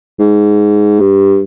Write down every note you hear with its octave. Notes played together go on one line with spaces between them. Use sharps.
G#2
G2